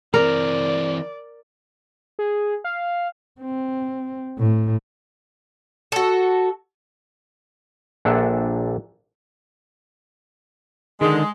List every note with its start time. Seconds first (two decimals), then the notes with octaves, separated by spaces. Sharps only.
0.14 E3 C4 A#4 D5
2.19 G#4
2.64 F5
3.41 C4
4.39 A2
5.92 F#4 A4
8.05 A#1 A#2 D4 A4 E5 F#5
11.01 D3 D#3 G#3